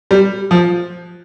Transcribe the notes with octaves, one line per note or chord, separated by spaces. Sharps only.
G3
F3